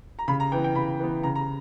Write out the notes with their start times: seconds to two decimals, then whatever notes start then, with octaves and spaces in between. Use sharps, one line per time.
0.19 A#5
0.28 C#3 B5
0.40 A#5
0.52 E3 B3 G5
0.64 G5
0.75 C#3 B5
1.00 E3 B3
1.23 C#3 A#5
1.35 A#5